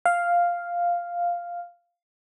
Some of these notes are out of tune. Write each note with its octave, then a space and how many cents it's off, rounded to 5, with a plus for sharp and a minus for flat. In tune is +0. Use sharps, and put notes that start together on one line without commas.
F5 +0